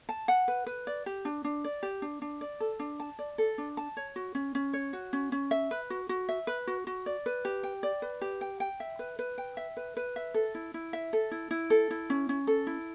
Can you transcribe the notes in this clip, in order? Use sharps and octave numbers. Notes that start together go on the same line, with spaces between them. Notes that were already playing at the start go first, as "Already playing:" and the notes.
A5
F#5
B4
B4
D5
G4
D4
D4
D5
G4
D4
D4
D5
A4
D4
A5
D5
A4
D4
A5
C#5
F#4
C#4
C#4
C#5
F#4
C#4
C#4
E5
B4
F#4
F#4
E5
B4
F#4
F#4
D5
B4
G4
G5
D5
B4
G4
G5
G5
E5
B4
B4
G5
E5
B4
B4
E5
A4
E4
E4
E5
A4
E4
E4
A4
E4
C#4
C#4
A4
E4